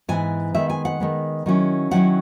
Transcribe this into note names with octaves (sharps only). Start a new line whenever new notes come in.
G#2 E3 B3 E4 G#5
D#3 G#3 B3 E5
G#5
F#5
D#3 G#3 B3
D#3 F#3 C#4 E4
D#3 F#3 C#4 E4 F#5